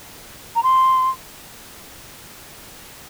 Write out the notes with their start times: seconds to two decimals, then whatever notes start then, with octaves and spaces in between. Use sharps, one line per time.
0.56 A#5
0.63 C6